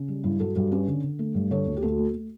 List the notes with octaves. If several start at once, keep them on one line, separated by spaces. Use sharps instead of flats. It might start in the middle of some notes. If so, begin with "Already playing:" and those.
Already playing: C#3
G3
G2 E4
G2 F#4 A4
G2 F#4 A4
C#4 G4 B4
D3
D3
A3
G2
D3 A4 C#5
D2
G4
D2 F#4 A4
A3
A3